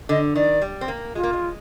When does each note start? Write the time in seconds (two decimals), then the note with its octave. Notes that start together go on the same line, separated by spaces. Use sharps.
0.09 D3 D#5
0.36 D#3 D5
0.62 G3
0.81 C4
0.88 A#3
1.15 G#3 F4
1.23 A#3
1.33 G#3